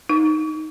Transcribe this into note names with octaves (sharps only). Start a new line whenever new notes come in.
D#4